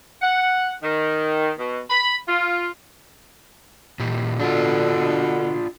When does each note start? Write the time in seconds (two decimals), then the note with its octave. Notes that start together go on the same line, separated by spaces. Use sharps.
0.22 F#5
0.82 D#3
1.58 B2
1.90 B5
2.28 F4
3.99 A#2 E3 G4
4.40 B2 D3 D4 F4